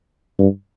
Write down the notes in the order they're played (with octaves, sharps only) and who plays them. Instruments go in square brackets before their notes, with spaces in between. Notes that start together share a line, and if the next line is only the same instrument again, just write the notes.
[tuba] G2